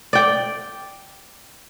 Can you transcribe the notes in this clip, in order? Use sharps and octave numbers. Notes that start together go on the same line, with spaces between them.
D5 G5